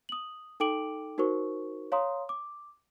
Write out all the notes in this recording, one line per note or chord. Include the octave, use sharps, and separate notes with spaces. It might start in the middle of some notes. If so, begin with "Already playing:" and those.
D#6 F#7
D#4 A4 G5 D6 D7 F#7
D#4 F#4 A#4 C5 C#6
C#5 F5 A#5 C6 D#6
D6